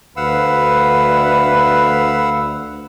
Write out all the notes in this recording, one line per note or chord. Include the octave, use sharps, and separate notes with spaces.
D2 B4 F5 F#5 E6